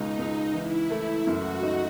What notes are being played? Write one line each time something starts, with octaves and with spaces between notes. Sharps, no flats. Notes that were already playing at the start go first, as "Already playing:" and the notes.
Already playing: C#2 B2 G#3 D#4
C#2
E3 E4
A3
F#2 F#4
D#4